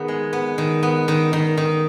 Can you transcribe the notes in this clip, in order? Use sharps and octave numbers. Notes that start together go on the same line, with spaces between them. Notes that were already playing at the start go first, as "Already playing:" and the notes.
Already playing: D#3 B3 G#4
G#3
B3
D#3
B3
D#3
D#3
D#3